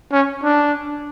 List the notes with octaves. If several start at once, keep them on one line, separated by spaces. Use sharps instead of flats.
C#4
D4